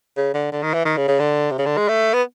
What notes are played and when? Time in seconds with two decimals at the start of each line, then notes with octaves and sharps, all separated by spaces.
0.17 C#3
0.34 D3
0.52 D3
0.63 D#3
0.74 E3
0.85 D#3
0.97 C#3
1.08 C#3
1.20 D3
1.51 C3
1.59 C#3
1.66 D3
1.77 G#3
1.89 A3
2.14 B3